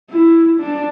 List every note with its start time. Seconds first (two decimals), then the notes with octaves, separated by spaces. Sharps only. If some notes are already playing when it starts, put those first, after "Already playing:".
0.11 E4
0.60 D4